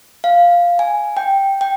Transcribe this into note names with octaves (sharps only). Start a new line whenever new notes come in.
F5
G#5
G5
G5